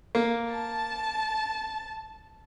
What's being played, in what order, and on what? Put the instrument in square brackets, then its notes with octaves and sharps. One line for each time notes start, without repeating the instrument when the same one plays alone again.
[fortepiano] A#3
[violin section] A5